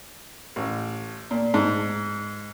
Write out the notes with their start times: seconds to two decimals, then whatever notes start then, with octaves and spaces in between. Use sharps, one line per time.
0.56 A1
1.31 A#2
1.54 G#2